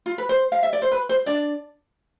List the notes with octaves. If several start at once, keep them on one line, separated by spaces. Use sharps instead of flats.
F4
B4
C5
F5
E5
D5
C5
B4
C5
D4 D5